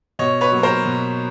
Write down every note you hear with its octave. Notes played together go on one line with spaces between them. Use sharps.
B2 C#5 D#5
B4 C#5
F#3 A#3
A#4 C5
B2